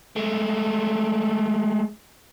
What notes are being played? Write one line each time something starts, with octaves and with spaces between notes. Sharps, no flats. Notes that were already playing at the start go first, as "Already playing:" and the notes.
G#3 A3